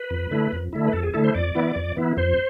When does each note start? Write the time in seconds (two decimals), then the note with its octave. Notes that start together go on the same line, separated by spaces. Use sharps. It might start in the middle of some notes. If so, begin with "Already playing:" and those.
Already playing: B4
0.10 F2
0.31 D3 A3 E4
0.53 F2
0.73 D3 A3 E4
0.87 B4
0.93 F2 A4
1.03 G#4
1.14 D3 A3 E4 A4
1.24 C5
1.34 F2 D5
1.55 E3 B3 E4
1.76 F2
1.96 E3 B3 E4
2.17 F2 C5